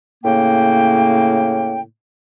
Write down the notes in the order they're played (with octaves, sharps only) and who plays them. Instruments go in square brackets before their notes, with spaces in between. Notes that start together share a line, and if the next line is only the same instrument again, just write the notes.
[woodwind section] A2 C#3 A#3 G5